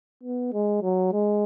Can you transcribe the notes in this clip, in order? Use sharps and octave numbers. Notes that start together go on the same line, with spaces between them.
B3
G#3
F#3
G#3